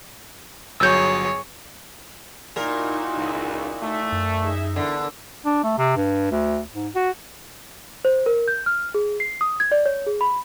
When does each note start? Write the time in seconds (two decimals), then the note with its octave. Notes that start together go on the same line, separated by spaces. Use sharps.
0.80 G1 F#3 G#4 C#5 E6 G6
2.56 A#2 D#4 E4 F#4 A#4
3.17 C#2
3.82 A3
4.12 F#2
4.41 D#4 G#4 E5
4.76 E2 D3 A#4
5.45 D4
5.64 A3
5.78 C3
5.96 G2
6.31 D2
6.74 G#2
6.95 F#4
8.05 C5
8.26 A#4
8.48 G6
8.66 F6
8.94 G#4
9.20 C7
9.41 D#6
9.60 G#6
9.72 D5
9.86 C#5
10.07 G#4
10.21 B5